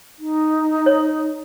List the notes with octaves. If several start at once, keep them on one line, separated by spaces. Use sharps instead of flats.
D#4
C#5